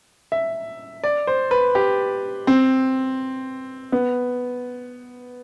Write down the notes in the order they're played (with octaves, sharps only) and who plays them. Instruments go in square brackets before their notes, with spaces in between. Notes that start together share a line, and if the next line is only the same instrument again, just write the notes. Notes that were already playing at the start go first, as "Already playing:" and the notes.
[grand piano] E5
D5
C5
B4
G4
C4
B3